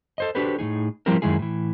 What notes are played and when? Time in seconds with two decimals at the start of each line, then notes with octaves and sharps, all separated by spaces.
0.18 A4 C5 D#5
0.35 D4 F#4 G4 A4 B4 C5
0.59 A2 A#3 D#4 G#4
1.06 F3 G3 C4 E4 G4 A#4
1.22 F#2 A#2 D#3 G#3 E4 G#4
1.39 A2 E3